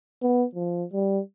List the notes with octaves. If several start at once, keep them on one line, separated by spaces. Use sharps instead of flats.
B3
F3
G3